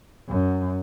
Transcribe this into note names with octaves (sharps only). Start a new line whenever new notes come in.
F#2